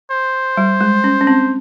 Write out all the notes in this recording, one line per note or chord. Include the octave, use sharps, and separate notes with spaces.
C5
G3
G#3
C#4
C#4
C4